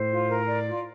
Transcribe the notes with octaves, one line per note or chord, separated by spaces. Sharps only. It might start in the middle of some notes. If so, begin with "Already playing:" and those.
Already playing: A2 C5
F4
A#4
D5
F4